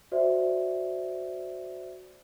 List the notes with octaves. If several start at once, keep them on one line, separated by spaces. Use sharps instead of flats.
F#4 C5 D5 E5